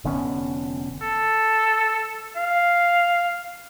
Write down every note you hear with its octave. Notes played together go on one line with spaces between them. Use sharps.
F1 D3 B3 C#4
A4
F5